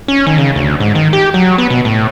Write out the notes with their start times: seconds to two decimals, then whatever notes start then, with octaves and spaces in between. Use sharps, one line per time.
0.08 C#4
0.27 D#3
0.38 C#3
0.55 D2
0.80 G#2
0.95 D#3
1.13 G4
1.34 F#3
1.58 B3
1.70 B2
1.85 A2